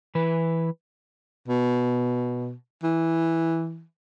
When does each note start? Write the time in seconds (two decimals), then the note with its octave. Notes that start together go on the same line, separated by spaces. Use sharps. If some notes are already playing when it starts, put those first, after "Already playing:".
0.15 E3 B4
1.48 B2
2.83 E3